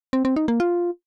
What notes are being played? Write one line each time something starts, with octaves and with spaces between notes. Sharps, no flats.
C4
C4
D#4
A#3
F4